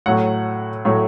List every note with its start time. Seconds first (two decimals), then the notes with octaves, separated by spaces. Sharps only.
0.06 A2 F#3 A3 F#5
0.85 A2 F#3 A3